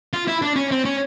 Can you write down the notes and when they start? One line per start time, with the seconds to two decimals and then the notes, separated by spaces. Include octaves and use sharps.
0.13 F4
0.28 E4
0.42 D4
0.56 C#4
0.71 C4
0.85 C#4